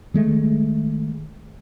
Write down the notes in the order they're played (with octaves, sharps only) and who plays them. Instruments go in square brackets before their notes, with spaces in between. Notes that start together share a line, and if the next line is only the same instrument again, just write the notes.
[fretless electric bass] D#3 G#3 A3